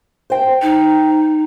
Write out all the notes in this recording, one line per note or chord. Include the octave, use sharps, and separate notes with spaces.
C5 G5
D#4